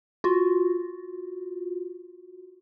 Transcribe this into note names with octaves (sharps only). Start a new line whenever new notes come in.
F4 F#4